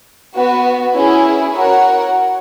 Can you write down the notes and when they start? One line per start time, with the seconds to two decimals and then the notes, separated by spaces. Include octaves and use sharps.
0.35 B3 F#4 B4
0.95 C#4 E4 G#4
1.55 F#4 A#4 C#5 F#5